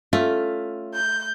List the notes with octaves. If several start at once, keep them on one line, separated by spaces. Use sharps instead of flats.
A3 C#4 F4
G6